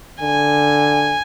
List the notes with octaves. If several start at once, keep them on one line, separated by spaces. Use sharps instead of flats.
D3 G#5